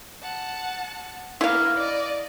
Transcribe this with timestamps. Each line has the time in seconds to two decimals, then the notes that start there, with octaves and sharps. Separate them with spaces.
0.22 F#5 A5
1.41 A#3 B3 E4 F5
1.76 D5 D#5